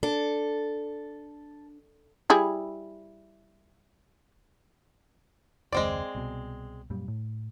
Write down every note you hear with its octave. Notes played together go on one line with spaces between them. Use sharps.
D4 A4
G3 E4 G#4
F#1 D#2 G#3 C4 D5
C2 B2
F#2 A#2 G3
A2